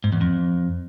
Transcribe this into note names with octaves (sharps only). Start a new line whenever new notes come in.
G#2
E2
F2